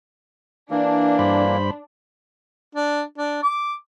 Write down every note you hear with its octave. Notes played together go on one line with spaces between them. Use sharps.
E3 A#3 D4
G2 C5 B5
D4
D4
D6